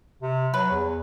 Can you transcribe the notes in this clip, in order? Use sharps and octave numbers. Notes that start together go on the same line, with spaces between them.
C3
F#3 B4
E2